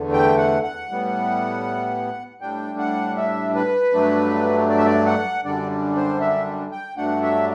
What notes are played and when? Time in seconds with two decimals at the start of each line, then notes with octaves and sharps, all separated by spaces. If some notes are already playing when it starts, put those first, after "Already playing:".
Already playing: E2 D3 A3
0.12 G5
0.38 F#5
0.63 F#5
0.89 A2 G3 B3
2.41 A2 G3 D4 G5
2.79 F#5
3.17 E5
3.55 B4
3.93 G2 F#3 A3 D4
4.69 D5
4.78 E5
4.85 D5
5.07 F#5
5.45 F#2 D3 G3 D4 D5
5.96 C5
6.20 E5
6.72 G5
6.97 G2 F#3 A3 D4 F#5
7.23 E5